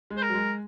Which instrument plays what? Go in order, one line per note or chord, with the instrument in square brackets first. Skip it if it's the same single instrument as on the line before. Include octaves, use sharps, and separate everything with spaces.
[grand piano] G#3
[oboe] C5
A#4
[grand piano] F#3
G#3